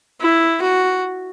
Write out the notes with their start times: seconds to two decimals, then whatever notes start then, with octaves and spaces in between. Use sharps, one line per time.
0.20 E4
0.62 F#4